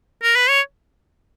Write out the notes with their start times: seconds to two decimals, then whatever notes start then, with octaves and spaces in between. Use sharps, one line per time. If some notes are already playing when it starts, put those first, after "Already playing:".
0.23 A#4
0.36 B4
0.49 C#5